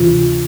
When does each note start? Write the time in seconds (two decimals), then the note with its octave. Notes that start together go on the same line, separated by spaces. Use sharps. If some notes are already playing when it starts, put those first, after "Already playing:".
Already playing: D2 C3 E3 F4